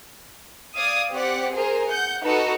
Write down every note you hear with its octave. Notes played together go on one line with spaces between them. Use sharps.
D5 F5 D#6 G#6
C4 G4 D5 F#5
G#4 A#4 C5
F#5 G6
D#4 F#4 A4 B4